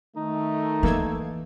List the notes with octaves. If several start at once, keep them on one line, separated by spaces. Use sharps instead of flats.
D#3 A3 D#4
E3 A#3 A4 G#6